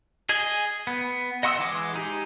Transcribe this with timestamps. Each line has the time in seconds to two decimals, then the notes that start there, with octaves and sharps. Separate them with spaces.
0.29 G#4 D#5 G#5
0.87 B3
1.43 D#5 F#5 C6 D#6 E6
1.59 E3 G#3 D6 D#6
1.94 G#3 D#4 G4